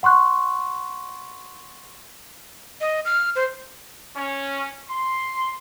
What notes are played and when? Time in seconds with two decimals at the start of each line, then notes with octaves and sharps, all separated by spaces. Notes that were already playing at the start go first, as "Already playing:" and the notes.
0.03 F#5 C6 C#6 F#6
2.81 D#5
3.05 F6
3.36 C5
4.15 C#4
4.88 C6